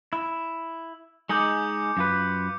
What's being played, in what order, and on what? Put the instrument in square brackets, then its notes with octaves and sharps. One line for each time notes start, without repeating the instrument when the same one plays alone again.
[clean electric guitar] E4
[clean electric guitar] G#3 D#4 G#4 [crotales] D6 G6 C#7
[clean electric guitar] F#2 F4 B4